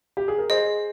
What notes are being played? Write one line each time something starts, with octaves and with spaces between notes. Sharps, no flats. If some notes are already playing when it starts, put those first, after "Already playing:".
G4
G#4
A#4
G#4 C5 D#5